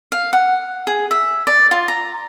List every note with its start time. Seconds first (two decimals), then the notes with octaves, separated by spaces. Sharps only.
0.12 F5
0.33 F#5
0.87 G#4
1.11 E5
1.47 D5
1.71 F4
1.88 A#5